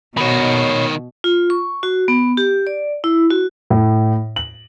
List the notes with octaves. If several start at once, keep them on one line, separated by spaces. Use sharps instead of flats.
B2 D#3 F#4 C#5 B5
F4
C#6
F#4
B3
G4
D5
E4
F#4
A2
F#7